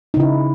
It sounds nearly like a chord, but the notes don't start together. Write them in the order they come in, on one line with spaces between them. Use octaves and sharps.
D#4 C#3 E4